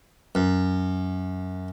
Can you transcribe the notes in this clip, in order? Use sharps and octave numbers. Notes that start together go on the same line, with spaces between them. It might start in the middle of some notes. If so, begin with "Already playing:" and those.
F#2